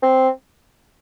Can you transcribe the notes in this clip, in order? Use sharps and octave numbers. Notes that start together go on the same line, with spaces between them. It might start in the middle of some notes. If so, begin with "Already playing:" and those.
C4